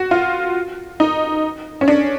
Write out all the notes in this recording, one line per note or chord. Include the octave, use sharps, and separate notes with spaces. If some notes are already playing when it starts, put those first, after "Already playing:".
Already playing: F#4
F4
D#4
C#4
D4